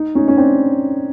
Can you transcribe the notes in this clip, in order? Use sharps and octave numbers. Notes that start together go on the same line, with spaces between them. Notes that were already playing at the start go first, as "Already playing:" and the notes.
Already playing: D#4
C#4 D#4
C#4
C4 D4